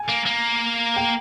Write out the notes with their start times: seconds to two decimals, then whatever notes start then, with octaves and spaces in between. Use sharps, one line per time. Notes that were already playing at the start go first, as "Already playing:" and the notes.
Already playing: G#5
0.09 A#3
0.26 A#3
0.96 G5